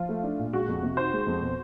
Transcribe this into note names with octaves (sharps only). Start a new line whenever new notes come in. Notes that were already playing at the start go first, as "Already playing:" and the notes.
Already playing: F3 F4
A3
D4
A#2
G#3 F#4
F2
C3
D#3 C5
G#3
F2
B2